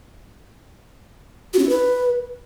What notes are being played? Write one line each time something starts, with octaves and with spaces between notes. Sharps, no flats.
F#4
C#4
E4
B4